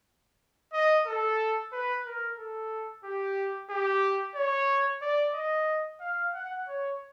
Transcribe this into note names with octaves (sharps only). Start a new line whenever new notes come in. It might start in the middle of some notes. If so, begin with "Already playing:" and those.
D#5
A4
B4
A#4
A4
G4
G4
C#5
D5
D#5
F5
F#5
C#5